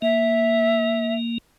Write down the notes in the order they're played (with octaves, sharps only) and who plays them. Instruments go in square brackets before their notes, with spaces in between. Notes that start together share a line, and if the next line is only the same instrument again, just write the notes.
[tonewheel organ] A#3 [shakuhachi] E5